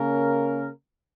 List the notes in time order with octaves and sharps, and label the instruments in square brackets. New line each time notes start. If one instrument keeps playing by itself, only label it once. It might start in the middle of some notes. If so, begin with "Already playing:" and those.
Already playing: [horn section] C#3 A#3 C#4 A#4